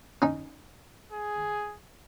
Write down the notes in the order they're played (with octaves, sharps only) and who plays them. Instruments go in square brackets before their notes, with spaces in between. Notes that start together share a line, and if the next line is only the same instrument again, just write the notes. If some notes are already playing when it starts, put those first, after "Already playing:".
[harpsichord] C#4 D#4
[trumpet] G#4